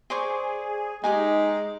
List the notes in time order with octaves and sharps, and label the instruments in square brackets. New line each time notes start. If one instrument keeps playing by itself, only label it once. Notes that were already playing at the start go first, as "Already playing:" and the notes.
[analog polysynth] G#4 [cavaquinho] C5 D5 C#6
[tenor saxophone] G#3 [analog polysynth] D#4 [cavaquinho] G4 G#4 G#5